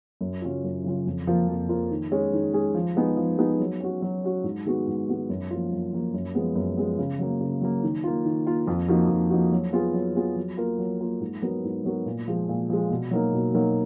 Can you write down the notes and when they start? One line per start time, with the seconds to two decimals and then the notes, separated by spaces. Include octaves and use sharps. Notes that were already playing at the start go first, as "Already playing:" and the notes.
0.21 F#2
0.42 C#3 F#3 C#4 F4
0.64 F#2
0.84 C#3 F#3 C#4 F4
1.06 F2
1.27 F3 A#3 F4 A#4
1.48 F2
1.69 F3 A#3 F4 A#4
1.91 D#3
2.12 G#3 C#4 G#4
2.33 D#3
2.53 G#3 C#4 G#4
2.75 F3
2.96 G#3 B3 D#4 G#4
3.17 F3
3.38 G#3 B3 D#4 G#4
3.60 F#3
3.80 C#4 F#4
4.02 F#3
4.24 C#4 F#4
4.44 G#2
4.65 D#3 G#3 B3 F#4
4.87 G#2
5.08 D#3 G#3 B3 F#4
5.30 F#2
5.51 F3 A#3 F4
5.71 F#2
5.93 F3 A#3 F4
6.14 F#2
6.35 F3 G#3 B3
6.55 F#2
6.77 F3 G#3 B3
6.99 C#3
7.19 F#3 A#3
7.41 C#3
7.61 F#3 A#3
7.83 D#3
8.04 A#3 F4
8.25 D#3
8.46 A#3 F4
8.67 F2
8.88 F3 A#3 D#4 F#4
9.09 F2
9.30 F3 A#3 D#4 F#4
9.52 F#3
9.73 B3 F4 G#4
9.94 F#3
10.16 B3 F4 G#4
10.36 F#3
10.57 A#3 F4 A#4
10.78 F#3
11.01 A#3 F4 A#4
11.21 G#2
11.42 F#3 B3 F#4 A#4
11.64 G#2
11.84 F#3 B3 F#4 A#4
12.06 A#2
12.28 F3 G#3
12.49 A#2
12.70 F3 G#3
12.91 B2
13.11 F#3 A#3 D#4 A#4
13.33 B2
13.54 F#3 A#3 D#4 A#4